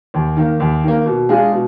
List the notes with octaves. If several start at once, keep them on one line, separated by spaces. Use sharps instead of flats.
D#2
D#3 A#3
D#2
D#3 A#3
B2
G#3 D4 F4 G#4
B2